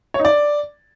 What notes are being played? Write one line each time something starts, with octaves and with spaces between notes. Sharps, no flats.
C#5
D#4
D5